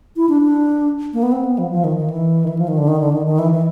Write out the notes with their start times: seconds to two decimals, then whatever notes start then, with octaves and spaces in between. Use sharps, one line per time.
0.16 E4
0.29 D4
0.42 D4
1.13 A#3
1.23 B3
1.32 C4
1.45 B3
1.58 F3
1.71 F3
1.84 D#3
1.97 D#3
2.10 E3
2.44 D#3
2.48 E3
2.59 F3
2.68 D#3
2.78 D3
2.88 D#3
3.00 D3
3.13 D#3
3.26 D#3
3.39 E3
3.52 E3